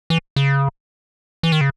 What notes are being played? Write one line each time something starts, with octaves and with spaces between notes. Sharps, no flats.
E3
C#3
E3
D#3
C#3